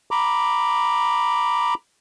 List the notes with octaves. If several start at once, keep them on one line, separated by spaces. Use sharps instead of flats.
A#5 B5 D6